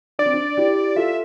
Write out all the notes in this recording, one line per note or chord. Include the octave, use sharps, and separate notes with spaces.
D4 D5
C4
D4
E4 G4
F4 A4 E5